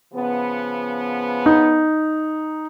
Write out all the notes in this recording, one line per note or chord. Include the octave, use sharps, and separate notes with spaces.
C#3 F3 B3
D#4